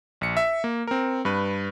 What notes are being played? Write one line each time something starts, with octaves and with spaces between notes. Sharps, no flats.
A#1 C#7
E5
A#3
C4 A#4
G2 B4